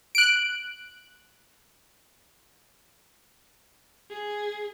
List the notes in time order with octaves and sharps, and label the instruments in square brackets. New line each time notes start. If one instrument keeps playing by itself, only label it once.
[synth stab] F#6 D7
[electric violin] G#4